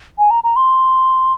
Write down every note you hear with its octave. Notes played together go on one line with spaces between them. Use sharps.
G#5
A#5
A#5
C6